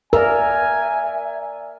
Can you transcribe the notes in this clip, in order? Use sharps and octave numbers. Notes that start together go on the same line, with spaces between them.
A#4 D5 E5 G#5 A#5 E6